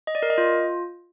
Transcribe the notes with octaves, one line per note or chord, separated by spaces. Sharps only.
D#5
D5
A#4
D#5
F4